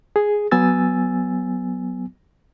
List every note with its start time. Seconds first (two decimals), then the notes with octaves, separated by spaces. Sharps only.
0.16 G#4
0.51 F#3 B3 G#5 E6 A6